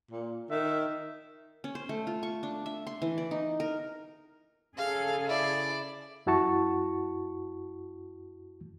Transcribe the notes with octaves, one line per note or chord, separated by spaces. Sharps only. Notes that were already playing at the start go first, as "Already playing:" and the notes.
A#2
D#3 E5
C#4
C5
A3
F4
C#6
D4
E5
C6
E3
D5
D#4
A#4
C#3 G#4 A4 F5
E4 D5
F#2 E4 F#4 A5 C#6